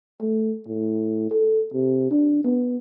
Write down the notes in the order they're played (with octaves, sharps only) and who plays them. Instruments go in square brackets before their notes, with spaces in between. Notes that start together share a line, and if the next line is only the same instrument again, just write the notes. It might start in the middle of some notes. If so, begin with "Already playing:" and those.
[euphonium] A3
A2
A4
C3
D4
B3